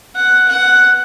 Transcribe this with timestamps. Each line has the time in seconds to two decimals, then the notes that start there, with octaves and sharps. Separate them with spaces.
0.15 F#5
0.48 F#5